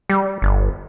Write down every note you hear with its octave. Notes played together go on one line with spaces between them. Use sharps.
G3
G1